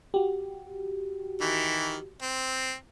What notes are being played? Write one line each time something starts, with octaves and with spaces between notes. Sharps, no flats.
F#4 G4
D#3 E3
C4